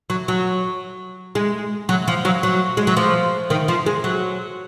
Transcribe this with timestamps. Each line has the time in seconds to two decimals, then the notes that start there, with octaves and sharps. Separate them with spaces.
0.10 F#3
0.28 F#3
1.35 G#3
1.89 F#3
2.08 F3
2.25 F#3
2.43 F#3
2.77 G#3
2.87 F#3
2.97 F3
3.50 D#3
3.68 F3
3.86 G#3
4.04 F#3